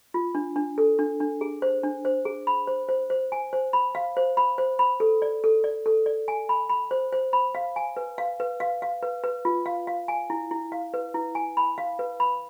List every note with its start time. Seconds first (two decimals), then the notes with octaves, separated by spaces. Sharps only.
0.14 F4
0.35 D4
0.56 D4
0.78 A4
0.99 D4
1.20 D4
1.41 G#4
1.62 C5
1.83 D4
2.05 C5
2.25 G#4
2.47 B5
2.67 C5
2.89 C5
3.10 C5
3.32 G#5
3.53 C5
3.73 B5
3.95 F5
4.17 C5
4.37 B5
4.58 C5
4.79 B5
5.00 A4
5.22 D5
5.44 A4
5.64 D5
5.86 A4
6.06 D5
6.28 G#5
6.49 B5
6.69 B5
6.91 C5
7.13 C5
7.33 B5
7.55 F5
7.76 G#5
7.97 B4
8.18 F5
8.40 B4
8.60 F5
8.82 F5
9.03 B4
9.24 B4
9.45 F4
9.66 F5
9.87 F5
10.08 G#5
10.30 E4
10.51 E4
10.72 F5
10.94 B4
11.14 E4
11.35 G#5
11.57 B5
11.78 F5
11.99 B4
12.20 B5